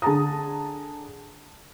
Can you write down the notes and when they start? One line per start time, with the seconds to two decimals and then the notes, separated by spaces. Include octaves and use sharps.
0.02 D3 G#4 A5 A#5 D#6